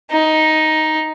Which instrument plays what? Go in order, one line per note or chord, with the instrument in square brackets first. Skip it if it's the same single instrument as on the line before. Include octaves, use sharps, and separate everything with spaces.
[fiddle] D#4